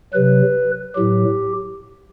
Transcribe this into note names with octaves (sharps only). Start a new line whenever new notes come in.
C3 F#3 B4
A2 F#3 G4